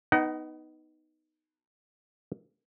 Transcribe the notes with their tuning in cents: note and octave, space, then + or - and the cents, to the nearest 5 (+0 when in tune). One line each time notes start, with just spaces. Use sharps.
B3 +0 D#4 +0 F#5 +40